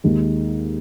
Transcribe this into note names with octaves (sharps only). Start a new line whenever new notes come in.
D#2 D#3 G#3